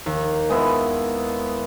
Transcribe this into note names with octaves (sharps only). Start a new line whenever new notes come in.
D#2
G#3 B3 E4